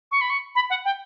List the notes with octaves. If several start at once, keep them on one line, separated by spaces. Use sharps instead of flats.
C#6
B5
C#6
B5
F#5
G5